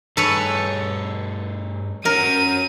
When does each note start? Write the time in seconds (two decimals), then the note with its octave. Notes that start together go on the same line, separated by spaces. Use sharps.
0.17 G2 G#4 A4 B4 C#5
2.05 F#3 C#4 F#4 A#4 D#7